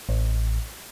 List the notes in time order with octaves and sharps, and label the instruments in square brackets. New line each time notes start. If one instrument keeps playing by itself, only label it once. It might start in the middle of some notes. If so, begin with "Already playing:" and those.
[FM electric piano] A1